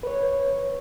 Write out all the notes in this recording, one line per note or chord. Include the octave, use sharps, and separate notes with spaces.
B4 C#5